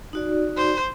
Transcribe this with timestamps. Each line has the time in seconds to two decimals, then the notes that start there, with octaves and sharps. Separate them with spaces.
0.13 D#4 F#4 D5
0.57 C5